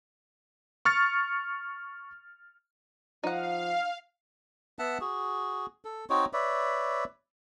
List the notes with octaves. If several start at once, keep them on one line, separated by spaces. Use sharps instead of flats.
C#6 F6 A6 C#7
F3 D#4 F5 F#5
B3 E5 F#5 A5
F#4 G#4
A4
C4 D#4 F#4 C#5
B4 C#5 D5 E5